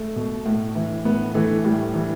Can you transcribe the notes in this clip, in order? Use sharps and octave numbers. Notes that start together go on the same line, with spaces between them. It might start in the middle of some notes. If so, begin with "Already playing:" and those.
Already playing: A3
B2
A2
E3
A2 B3
E3 A3
A2 G3
E3